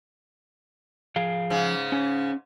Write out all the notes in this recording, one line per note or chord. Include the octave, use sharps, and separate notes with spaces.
F3 G#4 F5
G#2 C#3 G#3
C#4